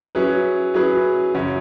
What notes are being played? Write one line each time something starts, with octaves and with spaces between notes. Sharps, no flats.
F#3 C#4 E4 G#4 B4
F#3 C#4 E4 G#4 B4
F#2 C#3 F#3 C#4 F#4